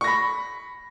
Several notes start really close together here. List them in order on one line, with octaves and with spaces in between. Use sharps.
C#6 A#6 B5